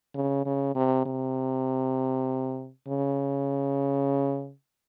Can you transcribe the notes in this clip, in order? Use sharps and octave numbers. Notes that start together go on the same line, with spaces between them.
C#3
C#3
C3
C3
C#3